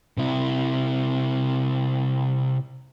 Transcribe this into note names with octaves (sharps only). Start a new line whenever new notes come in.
C3 E4